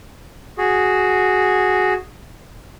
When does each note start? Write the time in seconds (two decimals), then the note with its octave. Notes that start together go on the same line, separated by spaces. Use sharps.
0.58 F#4 G#4